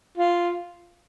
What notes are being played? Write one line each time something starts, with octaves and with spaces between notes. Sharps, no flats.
F4